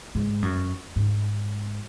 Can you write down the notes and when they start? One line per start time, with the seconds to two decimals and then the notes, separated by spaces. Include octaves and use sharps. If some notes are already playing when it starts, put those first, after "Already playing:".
0.15 G#2
0.42 F#2
0.96 G#2